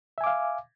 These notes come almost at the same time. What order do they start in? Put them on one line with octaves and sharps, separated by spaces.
E5 G#5 D6 F5